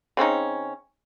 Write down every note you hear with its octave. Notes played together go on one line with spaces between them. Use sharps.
C#3 C4 C#4 D#4